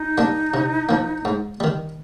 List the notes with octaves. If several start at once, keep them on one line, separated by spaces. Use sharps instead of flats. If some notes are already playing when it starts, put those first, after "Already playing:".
Already playing: D#4
G3 A#3 D4
C3
F3 A#3
G#2
D#3 G3